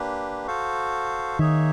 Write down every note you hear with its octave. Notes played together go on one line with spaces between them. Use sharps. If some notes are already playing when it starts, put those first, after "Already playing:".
Already playing: A#3 D4 G4 B4
F#4 A4 C5 F5
D#3 A#3 D#4 G#4 C#5 E5